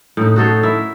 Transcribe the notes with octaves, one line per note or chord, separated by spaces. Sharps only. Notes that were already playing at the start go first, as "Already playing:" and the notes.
A2 D#4
F#4 A4 C5 C#5
E4 A#4 E5